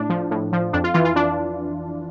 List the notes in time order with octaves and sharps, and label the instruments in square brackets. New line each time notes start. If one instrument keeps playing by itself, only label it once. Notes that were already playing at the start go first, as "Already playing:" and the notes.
Already playing: [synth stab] A2 D4
F3
A2
F3
F2 D4
F4
E3 F4
F4
D4